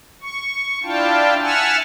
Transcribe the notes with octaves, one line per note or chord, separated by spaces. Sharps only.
C#6
D4 E4 F4 F5 G5 A5
E5 F#5 G#5 A5 E6 F6